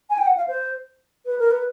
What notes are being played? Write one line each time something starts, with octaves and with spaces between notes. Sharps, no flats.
G#5
G5
F#5
F5
C5
B4
A#4
B4